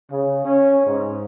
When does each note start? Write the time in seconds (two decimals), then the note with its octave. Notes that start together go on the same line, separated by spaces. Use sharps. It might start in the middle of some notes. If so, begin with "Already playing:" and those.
0.11 C#3
0.46 C#4
0.87 G#2